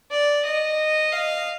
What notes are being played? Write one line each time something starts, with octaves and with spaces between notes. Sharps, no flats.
D5
D#5
F5